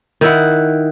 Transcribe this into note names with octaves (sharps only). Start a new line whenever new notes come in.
D#3 E4 F#5